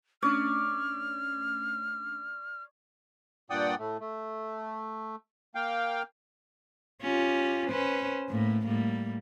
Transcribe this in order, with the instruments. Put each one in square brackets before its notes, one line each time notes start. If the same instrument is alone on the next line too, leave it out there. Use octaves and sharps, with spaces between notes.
[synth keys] A3 C#4 D4 [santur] C#5 D5 [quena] F6
[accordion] G2 A#2 D5 F#5 G5 D#6
A2 A3
A3
A#3 F5 G5
[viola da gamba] C#4 F4 G4
C#4 B4 C5
A2 A#3
A2 G3 A#3